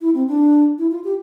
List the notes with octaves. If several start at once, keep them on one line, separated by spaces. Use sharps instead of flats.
E4
C4
D4
E4
F4
G4